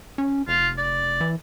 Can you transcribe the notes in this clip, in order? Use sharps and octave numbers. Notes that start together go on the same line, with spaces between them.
C#4
F1 F4
D5
E3